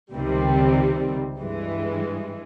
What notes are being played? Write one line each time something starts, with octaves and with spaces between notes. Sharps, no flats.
C#2 C3 D#3 G3 C4
G2 E3 G#3